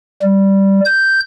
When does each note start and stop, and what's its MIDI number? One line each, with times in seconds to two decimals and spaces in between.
0.22 0.80 55
0.85 1.20 91